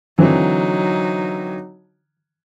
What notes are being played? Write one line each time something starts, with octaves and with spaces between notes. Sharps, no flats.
D3 E3 F#3 C4 D#4